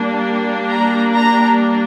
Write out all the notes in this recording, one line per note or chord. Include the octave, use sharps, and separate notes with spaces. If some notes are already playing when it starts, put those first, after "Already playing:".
Already playing: G3 A#3 D4
A#5
A#5